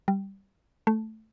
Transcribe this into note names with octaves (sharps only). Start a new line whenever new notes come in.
G3
A3